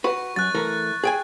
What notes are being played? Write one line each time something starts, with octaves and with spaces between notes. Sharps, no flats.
F#4 B4 C#6
F#2 F#6 A6
E3 A3 A#4
G#4 G5 G#5